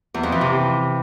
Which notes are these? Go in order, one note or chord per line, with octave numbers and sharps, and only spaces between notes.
E2
F2
E3
C3